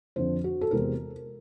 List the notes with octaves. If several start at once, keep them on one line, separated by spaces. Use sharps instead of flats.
F2 D3 F3 C5
F#4
A4
E2 C3 E3 G#3 C4 A#4